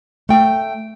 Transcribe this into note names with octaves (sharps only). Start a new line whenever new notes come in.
A3 G5